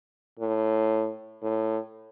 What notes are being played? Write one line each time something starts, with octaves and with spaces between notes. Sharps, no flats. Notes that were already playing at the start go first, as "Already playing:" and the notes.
A2
A2